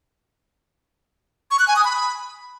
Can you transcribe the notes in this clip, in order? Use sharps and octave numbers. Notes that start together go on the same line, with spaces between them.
C#6
F#6
G#5
D#6
B5